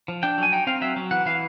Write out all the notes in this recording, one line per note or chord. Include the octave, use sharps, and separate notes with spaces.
F3
D4 G5
F#3 G#5
D#4 G5
C4 F5
F#3 E5
F#3
E3 F#5
E3 F5